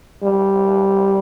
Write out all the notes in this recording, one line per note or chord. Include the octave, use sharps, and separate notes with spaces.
G3